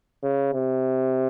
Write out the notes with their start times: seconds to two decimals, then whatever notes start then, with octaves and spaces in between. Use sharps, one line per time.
0.23 C#3
0.53 C3